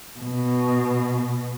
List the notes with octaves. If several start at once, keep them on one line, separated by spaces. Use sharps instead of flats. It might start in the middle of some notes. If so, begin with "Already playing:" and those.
B2